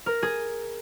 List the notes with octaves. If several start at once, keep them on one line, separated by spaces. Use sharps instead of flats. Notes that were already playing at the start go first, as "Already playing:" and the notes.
A#4
G#4